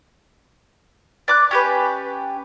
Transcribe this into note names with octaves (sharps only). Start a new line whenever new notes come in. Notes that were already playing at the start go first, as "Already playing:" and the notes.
D5 D6 F#6
C#4 G4 B4